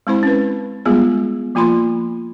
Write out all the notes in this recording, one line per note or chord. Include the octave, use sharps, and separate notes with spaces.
G#3 C4 E4 C5 B5
C#4 B4
G3 G#3 B3 F4 G#4
F3 A#3 F4 B5 C6